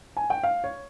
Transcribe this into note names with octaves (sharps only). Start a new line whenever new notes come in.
G#5
G5
F5
C#5